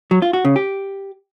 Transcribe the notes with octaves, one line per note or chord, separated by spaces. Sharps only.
F#3
F4
F#4
C#3
G4